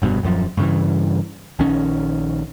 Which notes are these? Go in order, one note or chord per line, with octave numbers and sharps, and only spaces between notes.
F1 G2 B2
D#1 F#2 F3
G2 C#3 E3
A#1 D#3 C#4